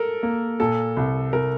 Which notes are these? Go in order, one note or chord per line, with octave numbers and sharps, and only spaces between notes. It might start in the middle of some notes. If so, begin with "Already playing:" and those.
Already playing: A4 A#4
A#3
A#2 A4
C2
C2 A#4